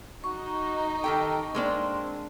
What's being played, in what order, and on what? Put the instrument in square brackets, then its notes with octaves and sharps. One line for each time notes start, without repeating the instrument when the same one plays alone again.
[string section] D#4 [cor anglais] F#4 [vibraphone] C#6
[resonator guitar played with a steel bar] D#3 G4 G5 [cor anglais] A4
[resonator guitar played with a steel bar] G#3 A#3 D4 [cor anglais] C4